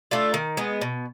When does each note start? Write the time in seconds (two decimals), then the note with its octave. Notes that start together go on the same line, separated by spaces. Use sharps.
0.11 A3 D4 F4
0.34 D#3
0.57 G#3 B3
0.81 B2